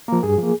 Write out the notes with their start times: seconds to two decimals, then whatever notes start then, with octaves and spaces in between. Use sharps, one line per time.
0.08 F3 A#3 A#4
0.23 G2 G#4
0.38 F3 A#3